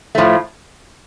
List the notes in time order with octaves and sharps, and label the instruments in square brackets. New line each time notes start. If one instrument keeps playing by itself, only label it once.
[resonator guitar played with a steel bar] A2 F3 A3